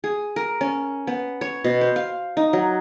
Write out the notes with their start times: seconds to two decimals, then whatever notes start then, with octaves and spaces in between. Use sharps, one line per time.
0.04 G#4
0.36 A#4
0.61 C#4
1.07 B3
1.41 C#5
1.64 B2
1.81 C5
1.96 F5
2.37 D#4
2.53 F#3